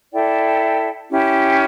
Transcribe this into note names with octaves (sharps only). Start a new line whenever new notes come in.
E4 A4 D5 G5
C#4 E4 G4